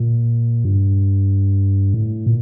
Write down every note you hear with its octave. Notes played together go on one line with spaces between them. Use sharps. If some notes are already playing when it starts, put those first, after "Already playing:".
Already playing: A#2
G2
A2
A#2